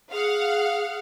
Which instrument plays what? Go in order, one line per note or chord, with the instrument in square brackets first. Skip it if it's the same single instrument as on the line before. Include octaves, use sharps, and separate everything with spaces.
[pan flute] G#4 [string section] F5 F#5